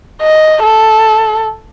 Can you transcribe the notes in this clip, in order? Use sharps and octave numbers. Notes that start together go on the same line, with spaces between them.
D#5
A4